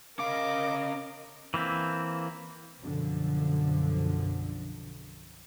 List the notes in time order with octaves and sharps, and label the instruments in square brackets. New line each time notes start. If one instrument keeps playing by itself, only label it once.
[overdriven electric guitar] C#4 F5 [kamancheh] A#4 D#5 [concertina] D6
[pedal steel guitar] E3 A#3 C4 E4
[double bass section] B1 F#2 D3 F3